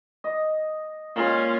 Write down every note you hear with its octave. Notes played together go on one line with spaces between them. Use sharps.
D#5
A#2 G#3 C#4 F4